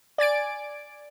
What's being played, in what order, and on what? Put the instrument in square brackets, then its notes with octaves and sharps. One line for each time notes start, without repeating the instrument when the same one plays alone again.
[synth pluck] D5 G#5 A6 D7